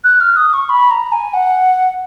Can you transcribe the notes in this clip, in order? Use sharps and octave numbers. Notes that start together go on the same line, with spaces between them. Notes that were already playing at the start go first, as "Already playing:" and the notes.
F#6
F6
D#6
C#6
B5
A#5
G#5
F#5